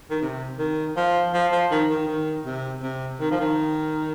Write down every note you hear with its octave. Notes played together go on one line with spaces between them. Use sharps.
D#3
C3
D#3
F3
F3
F3
D#3
D#3
D#3
C3
C3
D#3
F3
D#3